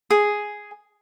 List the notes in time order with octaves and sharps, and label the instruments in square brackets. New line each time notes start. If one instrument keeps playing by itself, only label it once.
[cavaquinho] G#4